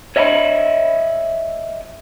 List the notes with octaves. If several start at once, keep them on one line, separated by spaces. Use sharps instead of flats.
C#5 D#5 E5 A5 B5